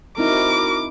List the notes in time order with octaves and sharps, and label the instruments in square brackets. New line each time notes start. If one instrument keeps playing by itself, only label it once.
[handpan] C4 D#4 E4 [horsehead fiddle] F#4 A#4 [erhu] D6